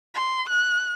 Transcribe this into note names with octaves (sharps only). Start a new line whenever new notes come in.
C6
F#6